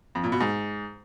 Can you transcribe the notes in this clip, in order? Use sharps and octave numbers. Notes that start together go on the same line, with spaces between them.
F2
A#2
B2
G#2